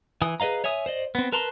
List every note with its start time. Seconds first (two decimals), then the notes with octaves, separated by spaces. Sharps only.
0.22 E3 G#5 D#6
0.40 G#4 B4 D#5 F5 A#5
0.64 C#5 E5 G#5 D#6
0.86 C5 D5 D#5
1.15 B3 C4
1.32 A#4 B4 A5 A#5 C6